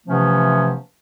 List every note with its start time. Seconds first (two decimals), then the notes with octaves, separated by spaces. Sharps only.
0.07 C3 E3 F3 A3 B3 C#4